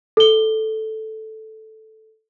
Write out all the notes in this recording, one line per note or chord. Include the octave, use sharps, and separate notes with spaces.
A4 G7